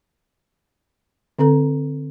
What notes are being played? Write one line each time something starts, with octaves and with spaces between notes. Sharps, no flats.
D3 C4 A4 A#5